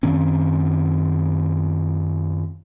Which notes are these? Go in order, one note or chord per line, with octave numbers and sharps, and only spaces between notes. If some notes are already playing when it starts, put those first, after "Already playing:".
F#2 D#3 C4 C#4